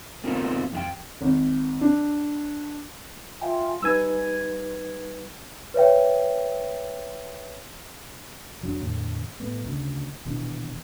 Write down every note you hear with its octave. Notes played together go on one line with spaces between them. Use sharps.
A3 B3 C4 D#4 F4 A#4
F2 E4 G5
G#1
D4
F4 E5 G5 G#5
G3 D#4 B4 G#5 E6
B4 C#5 E5 G5
F1 F#3 D4
E2 A2 D3
A2 G3 A3 B3
D2 C#3
D#1 B2 E3 D4